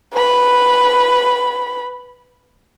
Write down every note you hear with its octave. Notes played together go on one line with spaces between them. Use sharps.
B4 B5